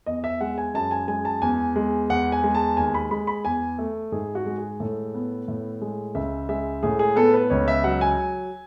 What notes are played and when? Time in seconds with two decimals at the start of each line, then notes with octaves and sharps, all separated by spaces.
0.06 E2 D#5
0.24 E5
0.41 G#3 F#5
0.58 G#5
0.74 F#2 A5
0.91 G#5
1.08 G#3 G#5
1.25 A5
1.41 E2 G#5
1.76 G#3
2.10 E2 F#5
2.32 G#5
2.44 G#3
2.55 A5
2.77 D#2 G#5
2.94 B5
3.11 G#3 B5
3.27 B5
3.45 E2 G#5
3.78 A3
4.12 G#2 G#4
4.35 F#4
4.46 G#3
4.58 G#4
4.80 A2 A4
5.14 B3
5.48 A2
5.81 G#3
6.15 C#2 E5
6.49 G#3 E5
6.83 A2 G#4
6.99 G#4
7.16 B3 A4
7.34 B4
7.50 C#2 C#5
7.68 E5
7.84 F#3 F#5
8.01 G#5